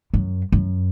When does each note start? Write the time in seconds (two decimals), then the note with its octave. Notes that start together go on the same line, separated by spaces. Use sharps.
0.14 F#2
0.52 F#2